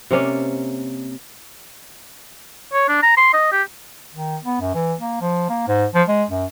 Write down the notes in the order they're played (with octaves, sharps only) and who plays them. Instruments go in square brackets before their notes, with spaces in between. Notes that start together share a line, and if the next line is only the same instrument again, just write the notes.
[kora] C3 A#3 C#4 D5
[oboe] C#5
D4
A#5
C6
D#5
G4
[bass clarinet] D#3
B3
F#2
E3
A#3
F3
A#3
G#2
F3
G#3
F#2